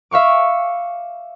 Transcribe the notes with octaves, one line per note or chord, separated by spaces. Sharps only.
E5 F5 C#6 D6